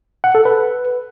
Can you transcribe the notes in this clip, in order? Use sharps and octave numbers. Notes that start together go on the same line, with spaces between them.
F#5
A4
B4